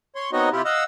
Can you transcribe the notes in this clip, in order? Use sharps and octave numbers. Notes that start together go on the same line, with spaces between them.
C#5 C6
B3 C4 D#4 F#4 C#5 D#5
C3 E4 F4 G4
D#5 F5 F#5 E6